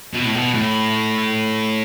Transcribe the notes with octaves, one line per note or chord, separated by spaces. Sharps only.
B2
A2
B2
A2